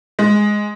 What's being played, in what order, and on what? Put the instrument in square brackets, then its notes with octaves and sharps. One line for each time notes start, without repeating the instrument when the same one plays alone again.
[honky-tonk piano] G#3